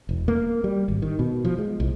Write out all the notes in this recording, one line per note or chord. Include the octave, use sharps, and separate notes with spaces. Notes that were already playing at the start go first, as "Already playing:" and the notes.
E1
A#3
G3
G#1
D#3
B2
F3
G#3
C2